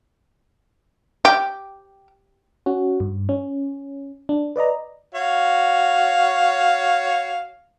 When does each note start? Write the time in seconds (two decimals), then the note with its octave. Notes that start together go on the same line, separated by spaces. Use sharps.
1.25 G4
2.66 C#4 F#4
3.00 G2
3.29 C#4
4.29 D4
4.56 B4 D5 D#5 A#5
5.15 F#4 C#5 F5